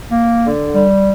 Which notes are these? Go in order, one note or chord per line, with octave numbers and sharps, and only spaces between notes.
A#3
D3
G3